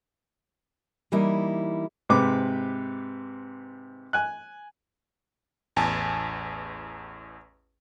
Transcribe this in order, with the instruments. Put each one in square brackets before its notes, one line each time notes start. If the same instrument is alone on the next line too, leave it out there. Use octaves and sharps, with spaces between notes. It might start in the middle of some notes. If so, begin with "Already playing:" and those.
[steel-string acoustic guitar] E3 G3 A#3 D#4 E4
[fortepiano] G#2 C3 B4 D6
G#5 F#6
[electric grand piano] A1 E2 G#5 A5